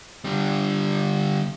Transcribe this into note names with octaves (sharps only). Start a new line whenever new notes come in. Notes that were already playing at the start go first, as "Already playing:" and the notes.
D3 G3